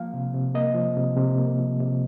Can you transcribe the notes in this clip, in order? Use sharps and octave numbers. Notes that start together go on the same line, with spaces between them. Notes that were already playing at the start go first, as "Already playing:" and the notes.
Already playing: F3 A#3 F5
C3
C3
A#3 D#5
F3
C3
C3
A#3
F3
C3